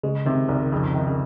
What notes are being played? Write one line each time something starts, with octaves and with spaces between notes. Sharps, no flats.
C#3 G#3
C3 D#3
C2 D#3
F2 C#3
D#3
C#3